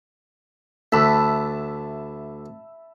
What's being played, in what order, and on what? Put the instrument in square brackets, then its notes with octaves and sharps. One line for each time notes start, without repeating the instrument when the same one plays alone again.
[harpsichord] D2 [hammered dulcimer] E5 A5 B5